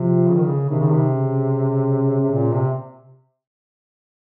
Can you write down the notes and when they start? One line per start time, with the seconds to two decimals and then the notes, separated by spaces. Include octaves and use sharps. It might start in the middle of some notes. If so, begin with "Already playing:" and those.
Already playing: C3 F3
0.29 C#3
0.37 D#3
0.45 C#3
0.70 C3 D#3
0.80 C#3
0.91 C3
1.11 C#3
2.21 C3
2.32 A#2
2.53 C3